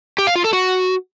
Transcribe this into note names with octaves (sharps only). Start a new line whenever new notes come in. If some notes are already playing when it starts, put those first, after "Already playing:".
G4
F5
F4
A4
F#4